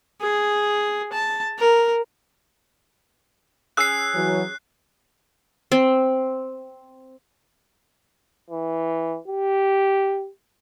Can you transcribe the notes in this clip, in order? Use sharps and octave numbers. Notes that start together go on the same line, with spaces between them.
G#4
A5
A#4
C#4 G#4 E6 F#6 C7
E3 F#3
C4
E3
G4